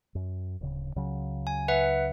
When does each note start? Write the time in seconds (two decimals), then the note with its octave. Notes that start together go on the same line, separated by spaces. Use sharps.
0.15 F#2
0.61 D1 C#3
0.96 C#2 C#3 F#3
1.47 G#5
1.68 B4 E5 F#5